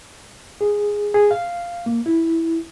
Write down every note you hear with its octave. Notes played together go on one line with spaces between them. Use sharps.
G#4
G#4
F5
A#3
E4